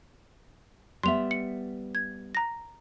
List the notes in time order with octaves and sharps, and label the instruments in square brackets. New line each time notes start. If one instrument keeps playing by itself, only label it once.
[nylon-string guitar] G3 B3 E5 [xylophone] C6 F7
[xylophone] C#7
G#6
A#5 A#6